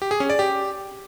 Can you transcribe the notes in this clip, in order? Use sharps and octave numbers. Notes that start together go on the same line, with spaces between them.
G4
G#4
C#4
D5
G4